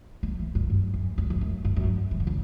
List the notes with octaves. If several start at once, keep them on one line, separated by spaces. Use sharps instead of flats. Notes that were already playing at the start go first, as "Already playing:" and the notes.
A#3
E3
G2
F#2
E2
F#2
E2
F#2
G2
F#2
E3
D3
C#3